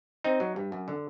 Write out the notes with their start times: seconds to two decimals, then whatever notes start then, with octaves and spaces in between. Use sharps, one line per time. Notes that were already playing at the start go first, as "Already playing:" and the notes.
0.24 C4 D#4
0.40 F#3
0.56 G2
0.72 F#2
0.88 D3